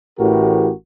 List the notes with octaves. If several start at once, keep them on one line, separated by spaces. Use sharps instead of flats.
A1 A2 E3 F#4 G4 A#4